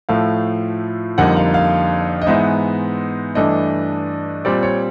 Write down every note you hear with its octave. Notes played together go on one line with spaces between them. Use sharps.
A2 F3 A3 F5
F2 D3 G3 A#3 D#4 F#5
F5
F5
D#5
G#2 E3 G#3 B3 D#4 E5
G2 E3 A3 D4 D#5
A#2 G3 C4 D5
C#5